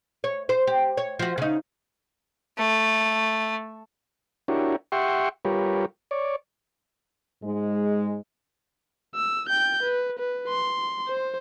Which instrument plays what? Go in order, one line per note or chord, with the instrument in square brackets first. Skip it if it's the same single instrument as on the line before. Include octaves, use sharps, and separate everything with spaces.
[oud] C#5
C5
G4
C#5
F3 F#4
C#3 D#4
[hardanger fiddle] A3
[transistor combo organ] D4 E4 F#4 G4 A#4 C#5
G4 E5 F#5 G5 C6 C#6
G3 F4 G4 A#4 B4 C#5
C#5 D5
[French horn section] G#2 G#3
[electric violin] E6
G5 G6
B4
B4
C6
C5